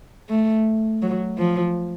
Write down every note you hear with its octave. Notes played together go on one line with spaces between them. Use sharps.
A3
F#3
F3